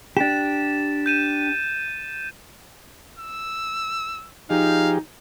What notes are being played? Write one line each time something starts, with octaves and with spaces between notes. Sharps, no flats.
D4 G4 A6 E7
G6 D#7 E7
E6
F3 D#4 G4 G#4 F5